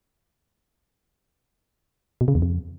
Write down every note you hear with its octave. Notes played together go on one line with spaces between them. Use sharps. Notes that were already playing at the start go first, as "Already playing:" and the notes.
B2
C#3
E2
F2